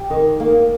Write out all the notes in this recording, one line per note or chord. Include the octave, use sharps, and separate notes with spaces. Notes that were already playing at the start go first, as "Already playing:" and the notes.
Already playing: G4
D#3
A#3